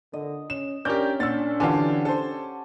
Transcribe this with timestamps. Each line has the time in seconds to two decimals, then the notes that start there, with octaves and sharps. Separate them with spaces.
0.13 D3 D#5
0.50 C#4 E7
0.85 C#4 D4 G4 A#4 D5 G6
1.20 A#2 D4 F#5 E6 A6
1.60 D3 E3 F4 G4 C#5 F#5 G#5 A5
2.05 A4 C5